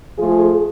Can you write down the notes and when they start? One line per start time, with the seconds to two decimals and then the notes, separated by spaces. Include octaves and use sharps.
0.17 F3 A3 F4 G#4